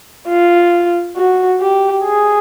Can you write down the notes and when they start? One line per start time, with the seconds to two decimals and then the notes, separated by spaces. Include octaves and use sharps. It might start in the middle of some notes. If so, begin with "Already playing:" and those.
0.28 F4
1.16 F#4
1.60 G4
2.04 G#4